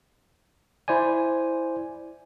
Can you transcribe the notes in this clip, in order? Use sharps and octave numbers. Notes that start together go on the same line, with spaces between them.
E4 C5 D5 G#5